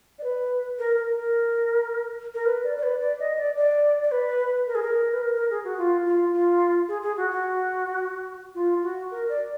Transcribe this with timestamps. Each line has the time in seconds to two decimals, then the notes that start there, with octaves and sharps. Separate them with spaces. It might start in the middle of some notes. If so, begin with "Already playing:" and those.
0.19 D5
0.24 B4
0.79 A#4
0.97 A#4
1.16 A#4
2.34 A#4
2.46 B4
2.64 D5
2.77 D5
2.83 B4
3.01 D5
3.20 D#5
3.38 D5
3.57 D5
4.03 D5
4.12 B4
4.67 A#4
4.75 G#4
4.83 A#4
5.13 B4
5.22 A#4
5.37 A#4
5.50 G#4
5.65 F#4
5.78 F4
6.06 F4
6.33 F4
6.88 G#4
7.03 G#4
7.17 F#4
7.31 F#4
8.55 F4
8.83 F#4
9.11 A#4
9.29 D5